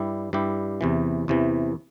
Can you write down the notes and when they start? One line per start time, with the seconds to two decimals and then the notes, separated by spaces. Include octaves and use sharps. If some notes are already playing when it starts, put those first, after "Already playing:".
Already playing: G2 G3 E4 G4
0.33 G2 G3 E4 G4
0.81 E2 C3 E3
1.28 E2 C3 E3